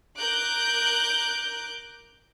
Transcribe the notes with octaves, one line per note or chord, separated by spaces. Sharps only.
A#4 D6 F#6 G6